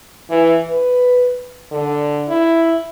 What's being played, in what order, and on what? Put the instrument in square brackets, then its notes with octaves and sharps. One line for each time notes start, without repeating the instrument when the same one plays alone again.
[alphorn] E3
B4
D3
E4